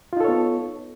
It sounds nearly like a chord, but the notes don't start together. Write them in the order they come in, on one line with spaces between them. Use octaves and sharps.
F4 D#4 A4 C#5 B3